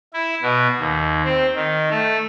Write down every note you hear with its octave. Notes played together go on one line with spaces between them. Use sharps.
E4
B2
D#2
C4
D#3
A3